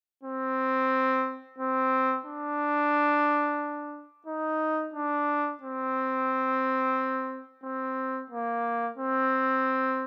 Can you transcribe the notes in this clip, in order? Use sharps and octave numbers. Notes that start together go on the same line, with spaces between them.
C4
C4
D4
D#4
D4
C4
C4
A#3
C4